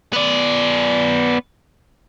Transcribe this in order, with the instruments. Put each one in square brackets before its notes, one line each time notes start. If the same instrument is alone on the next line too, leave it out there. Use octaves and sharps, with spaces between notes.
[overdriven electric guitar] B3 D5